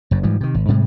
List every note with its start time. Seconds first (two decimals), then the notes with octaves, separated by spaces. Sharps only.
0.11 F#1 F#2
0.23 G#2 E3 F3 G3
0.41 C3 D#3
0.54 G#1
0.68 G#2 C3 G3 G#3